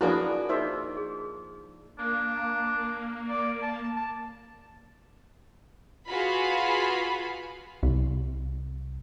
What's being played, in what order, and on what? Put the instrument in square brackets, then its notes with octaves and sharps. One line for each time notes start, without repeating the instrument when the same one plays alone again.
[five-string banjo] F3 A#3 D4 [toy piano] E4 D#6 [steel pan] F#4 G#4 B4
[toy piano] D#4 G#4 D#5 [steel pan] A#4 C5 E5
[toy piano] G#4
[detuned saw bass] A#3 [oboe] D4
[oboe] D5
A5
A5
[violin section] F4 F#4 G#4 B4 F5 B5
[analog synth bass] C2